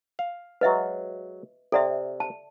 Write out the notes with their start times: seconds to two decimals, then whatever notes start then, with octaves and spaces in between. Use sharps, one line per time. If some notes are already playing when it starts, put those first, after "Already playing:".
0.19 F5
0.61 F#3 G#3 B4 D#5 E5
1.72 C3 A4 D5 E5
2.20 A5